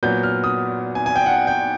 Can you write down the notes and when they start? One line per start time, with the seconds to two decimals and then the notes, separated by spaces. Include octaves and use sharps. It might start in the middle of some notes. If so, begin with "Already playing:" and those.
0.03 A#2 F#3 B3 G6
0.23 F6
0.44 D#6
0.95 G#5
1.06 G#5
1.16 G5
1.26 F#5
1.47 G5